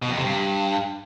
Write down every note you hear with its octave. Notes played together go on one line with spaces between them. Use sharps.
B2
F2
C3
G2